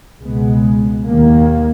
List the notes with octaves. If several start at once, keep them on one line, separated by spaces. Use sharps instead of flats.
C#2 B2 G#3 B3
D#2 D#3 A#3